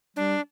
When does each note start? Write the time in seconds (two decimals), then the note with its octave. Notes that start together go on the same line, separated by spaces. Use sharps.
0.16 G3 D4